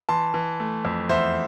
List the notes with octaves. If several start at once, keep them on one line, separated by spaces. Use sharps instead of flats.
E3 A5 C6
E3
A3
F2
E2 C5 E5